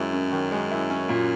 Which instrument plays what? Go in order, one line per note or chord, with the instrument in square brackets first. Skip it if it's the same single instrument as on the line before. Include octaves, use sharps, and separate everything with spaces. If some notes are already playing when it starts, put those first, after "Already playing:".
Already playing: [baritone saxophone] F#2 [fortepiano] D#3 G#3 E4
[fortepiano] C#4
D#3
G#3
E4
C#4
A#2